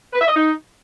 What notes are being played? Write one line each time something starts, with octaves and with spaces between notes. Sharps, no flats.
B4
E5
D#5
D#4